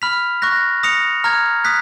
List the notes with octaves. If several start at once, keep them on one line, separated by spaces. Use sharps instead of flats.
B5 F6 B6 F7
C#6 F#6 A#6
D#6 A#6 C#7 F7
A#5 F6 G#6
D#6 F#6 B6